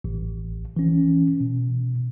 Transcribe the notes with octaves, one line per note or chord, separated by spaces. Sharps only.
A1
E3 C#4
B2